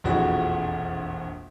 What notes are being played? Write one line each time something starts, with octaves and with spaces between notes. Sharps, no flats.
E1 A#1 F2 E4 F#4